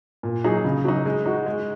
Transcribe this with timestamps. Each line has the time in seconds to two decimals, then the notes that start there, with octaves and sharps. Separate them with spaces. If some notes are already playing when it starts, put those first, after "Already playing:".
0.23 A#2
0.44 F#3 D#4 G#4
0.64 C#3
0.85 F#3 D#4
1.05 G#3
1.26 D#4 F#4
1.46 G#3